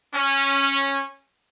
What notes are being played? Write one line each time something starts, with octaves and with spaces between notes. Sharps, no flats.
C#4